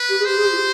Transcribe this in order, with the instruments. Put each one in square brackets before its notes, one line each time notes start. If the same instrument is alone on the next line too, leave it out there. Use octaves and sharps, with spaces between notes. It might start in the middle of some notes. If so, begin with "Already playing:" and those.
Already playing: [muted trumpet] B4
[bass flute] G4
G#4
[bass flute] G4 [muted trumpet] C5
[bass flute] G#4
G4
F4
G4